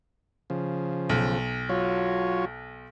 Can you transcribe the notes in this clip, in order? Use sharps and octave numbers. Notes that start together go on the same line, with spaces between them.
C#3 F3
B1
F#3 F4 C#5